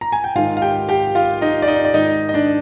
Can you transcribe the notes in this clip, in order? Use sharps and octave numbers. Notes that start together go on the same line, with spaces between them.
A#5
G#5
G5
G#2 D#3 F4 F5
F5
G4 G5
G4 G5
F4 F5
D#4 D#5
D5
D#4 D#5
D5
G#2 D#3 D#4 D#5
D#5
D4 D5